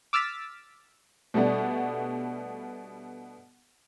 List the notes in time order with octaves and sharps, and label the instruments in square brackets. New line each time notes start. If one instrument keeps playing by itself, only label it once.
[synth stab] D6 E6 F6 A6 B6
[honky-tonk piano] B2 G3 A3 B3 D4